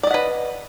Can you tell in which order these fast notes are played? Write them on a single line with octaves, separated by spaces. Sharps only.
D5 D#5 F#5 B4